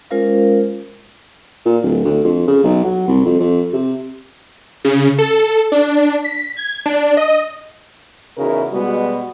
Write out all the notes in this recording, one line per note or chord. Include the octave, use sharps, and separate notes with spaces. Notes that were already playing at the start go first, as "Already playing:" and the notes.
G#3 C#4 F4 A#4 C5 F5
A#2
D1
D2
F2
C#3
B1
F#3
C2
F2
F2
C3
C#3
A4
D4
B6
G#6
D4
D#5
E2 C#3 D#4 E4 F#4 A#4
B2 G3 G#3 B3 F#4